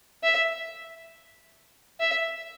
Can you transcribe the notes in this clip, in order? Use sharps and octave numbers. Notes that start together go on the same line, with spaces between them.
E5
E5